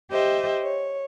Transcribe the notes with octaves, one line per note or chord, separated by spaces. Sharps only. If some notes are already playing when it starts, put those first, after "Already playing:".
G4 C5 D#5 E5
C#5